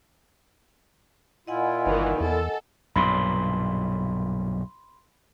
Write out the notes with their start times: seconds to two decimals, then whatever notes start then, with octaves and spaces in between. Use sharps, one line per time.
1.47 A#2 E4 F4 D#5 F#5 G#5
1.86 G1 D#3 E3
2.20 E2 A4
2.96 B1 G2 A#2 B5 C6